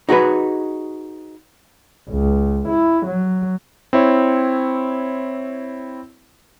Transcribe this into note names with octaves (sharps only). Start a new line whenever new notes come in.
D#4 F#4 G#4 B4
C#2
E4
F#3
C4 E4 C#5